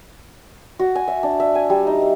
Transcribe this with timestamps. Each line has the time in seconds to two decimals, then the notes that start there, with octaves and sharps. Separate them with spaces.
0.79 F#4
0.95 G#5
1.08 E5
1.23 D4
1.40 E5
1.55 G#5
1.70 G3
1.87 D#4
2.02 E5